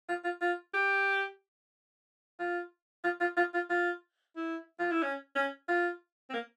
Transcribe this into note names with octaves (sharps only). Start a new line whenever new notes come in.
F4
F4
F4
G4
F4
F4
F4
F4
F4
F4
E4
F4
E4
C#4
C#4
F4
C4
A#3